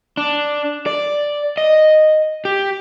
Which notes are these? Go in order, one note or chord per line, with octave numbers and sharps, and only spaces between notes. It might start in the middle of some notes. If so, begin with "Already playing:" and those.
D4
D5
D#5
G4